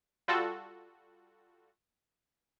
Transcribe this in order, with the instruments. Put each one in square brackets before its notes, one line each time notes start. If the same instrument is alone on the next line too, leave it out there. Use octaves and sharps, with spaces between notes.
[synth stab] G3 F4 F#4 A4